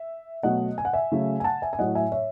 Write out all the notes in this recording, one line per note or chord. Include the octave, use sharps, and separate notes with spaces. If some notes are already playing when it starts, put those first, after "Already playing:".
Already playing: E5
B2 F#3 A3 D#5 F#5
G#5
F#5
E5 G#5
C#3 F#3 A3
G#5
F#5 A5
E5 G#5
G#5
A2 F#3 A3 D#5 F#5
E5 G#5
C#5 E5